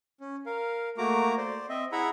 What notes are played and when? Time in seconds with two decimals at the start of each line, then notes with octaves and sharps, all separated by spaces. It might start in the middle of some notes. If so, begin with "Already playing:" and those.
0.21 C#4
0.46 A#4 F5
0.98 A3 A#3 F#4 A#5 D6
1.37 C5 D5
1.69 C4 D#5 E5
1.92 E4 G#4 E5 F#5 A#5 B5